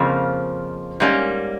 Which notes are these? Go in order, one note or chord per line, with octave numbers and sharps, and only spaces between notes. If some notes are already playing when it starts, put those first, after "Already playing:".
Already playing: F2 C#3 F3 A#3
G#2 G3 A#3 C#4